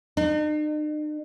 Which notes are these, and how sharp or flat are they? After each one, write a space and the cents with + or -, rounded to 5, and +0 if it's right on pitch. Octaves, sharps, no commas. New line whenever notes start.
D#4 -45